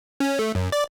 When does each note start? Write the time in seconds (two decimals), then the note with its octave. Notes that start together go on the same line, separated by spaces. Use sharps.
0.20 C#4
0.39 A3
0.55 F#2
0.72 D5